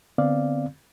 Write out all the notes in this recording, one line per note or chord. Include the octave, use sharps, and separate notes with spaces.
D3 B3 C4 D5 F5